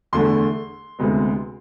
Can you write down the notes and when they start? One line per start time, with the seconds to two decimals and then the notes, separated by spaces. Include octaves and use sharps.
0.13 E2 D3 A3 C6
0.99 D2 C3 G#3 B3